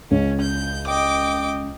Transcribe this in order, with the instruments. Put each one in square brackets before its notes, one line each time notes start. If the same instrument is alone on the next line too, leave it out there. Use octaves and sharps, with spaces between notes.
[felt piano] C#2 [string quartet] C#4
[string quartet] G6
D#5 G5 D6